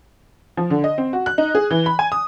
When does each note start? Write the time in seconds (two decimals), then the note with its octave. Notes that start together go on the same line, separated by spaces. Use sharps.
0.57 F3
0.70 D3
0.84 D#5
0.98 C4
1.13 F#4
1.26 F#6
1.38 D#4
1.55 G#4
1.71 E3
1.86 B5
1.99 G#5
2.12 D#6